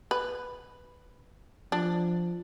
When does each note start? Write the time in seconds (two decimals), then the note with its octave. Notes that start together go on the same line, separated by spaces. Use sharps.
0.11 B4
1.72 F3 D4